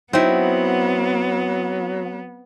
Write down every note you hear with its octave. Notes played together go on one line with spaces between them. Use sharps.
F#3 B3 C4 D#4 E4